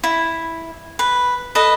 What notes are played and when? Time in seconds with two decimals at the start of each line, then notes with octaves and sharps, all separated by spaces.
0.04 E4
0.99 B4
1.55 A4 B4 D#5